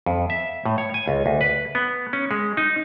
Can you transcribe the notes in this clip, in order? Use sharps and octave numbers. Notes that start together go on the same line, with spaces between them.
F2
E5
A2
C#5
G#5
C#2
D2
B4
B3
C#4
G#3
D#4